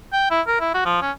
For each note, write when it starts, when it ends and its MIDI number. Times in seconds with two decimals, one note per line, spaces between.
0.13 0.28 79
0.30 0.41 64
0.47 0.59 70
0.60 0.70 64
0.74 0.81 66
0.85 1.00 53
1.02 1.11 61